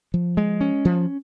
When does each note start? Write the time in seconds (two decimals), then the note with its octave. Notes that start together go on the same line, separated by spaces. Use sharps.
0.14 F3
0.37 G#3
0.61 C#4
0.85 F3